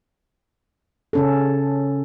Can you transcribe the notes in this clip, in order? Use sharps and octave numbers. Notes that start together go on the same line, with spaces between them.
C#3 C#4 A4